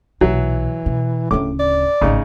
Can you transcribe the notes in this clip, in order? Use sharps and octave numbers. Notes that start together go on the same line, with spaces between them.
B1 A#2 E3 F#3
B2
D1 A2 C#3 D6
D5
G#1 A2 C#3 D#4